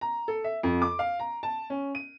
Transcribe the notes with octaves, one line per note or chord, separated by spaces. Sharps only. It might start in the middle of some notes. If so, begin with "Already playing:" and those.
A#5
A4
E5
F2
D6
F5
A#5
A5
C#4
D#7